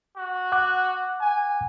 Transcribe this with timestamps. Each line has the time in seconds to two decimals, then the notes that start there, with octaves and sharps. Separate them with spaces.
0.17 F#4
0.52 F#5 D6 F#6
1.21 G#5